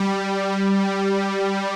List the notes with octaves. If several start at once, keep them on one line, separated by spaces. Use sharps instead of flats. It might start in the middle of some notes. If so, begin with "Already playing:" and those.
Already playing: G3